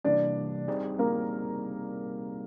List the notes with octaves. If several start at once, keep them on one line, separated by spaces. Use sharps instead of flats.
C3 E3 G3 A#3 D4 D5
G3 C4 D#4 G#4
A#3 A#4